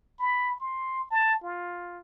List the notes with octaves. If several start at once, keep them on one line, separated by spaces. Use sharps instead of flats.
B5
C6
A5
F4